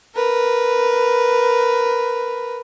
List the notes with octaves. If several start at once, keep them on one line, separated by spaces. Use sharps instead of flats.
A#4 B4